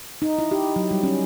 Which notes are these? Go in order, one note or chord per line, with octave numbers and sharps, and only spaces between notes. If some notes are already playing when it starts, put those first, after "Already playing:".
D#4
E4
G4
F#3
G3
C#4